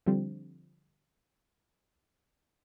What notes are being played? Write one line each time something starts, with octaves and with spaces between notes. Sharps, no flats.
D3 F3 G3 C4